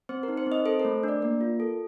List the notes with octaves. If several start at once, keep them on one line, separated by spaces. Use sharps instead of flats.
C4 C5
A#4
D#4
C5
C4 D#5
A4 C5
A#4
A3
D4 D5
A#3 A#4
F4
A4